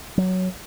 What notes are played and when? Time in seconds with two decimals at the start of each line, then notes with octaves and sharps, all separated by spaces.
0.18 F#3